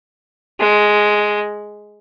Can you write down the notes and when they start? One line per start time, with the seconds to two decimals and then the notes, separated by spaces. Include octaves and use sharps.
0.60 G#3